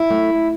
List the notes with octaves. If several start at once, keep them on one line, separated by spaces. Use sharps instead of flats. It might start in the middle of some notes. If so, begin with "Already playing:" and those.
Already playing: E4
A3